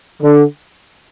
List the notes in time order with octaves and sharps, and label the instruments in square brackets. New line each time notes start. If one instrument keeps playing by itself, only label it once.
[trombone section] D3